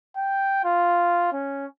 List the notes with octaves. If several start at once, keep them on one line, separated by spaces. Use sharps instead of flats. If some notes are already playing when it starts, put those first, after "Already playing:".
G5
F4
C#4